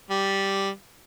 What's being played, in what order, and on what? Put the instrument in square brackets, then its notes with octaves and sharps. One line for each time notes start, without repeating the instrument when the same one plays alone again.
[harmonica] G3